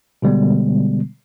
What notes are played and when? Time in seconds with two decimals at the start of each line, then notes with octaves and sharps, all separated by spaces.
0.22 B2 D3 G3 G#3 B3